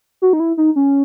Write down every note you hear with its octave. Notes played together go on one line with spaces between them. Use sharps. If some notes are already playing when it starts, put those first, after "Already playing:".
F#4
D#4
E4
D#4
C#4